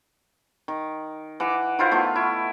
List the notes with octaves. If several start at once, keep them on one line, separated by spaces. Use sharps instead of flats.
D#3
E3 F#5 D6
D#3 E4 F4 C5
A3 B3 F4
E4